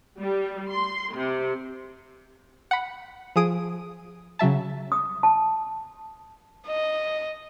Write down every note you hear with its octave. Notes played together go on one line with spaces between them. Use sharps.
G3
C6
C3
F#5 B5
F3 G#4 D#6 D7 D#7
C#3 F#3 E5 A5
D#6
A5
D#5